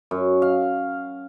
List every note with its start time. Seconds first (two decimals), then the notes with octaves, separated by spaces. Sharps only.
0.11 F#2
0.42 F5